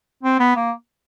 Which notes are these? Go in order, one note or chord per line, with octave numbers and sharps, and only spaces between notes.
C4
B3
A#3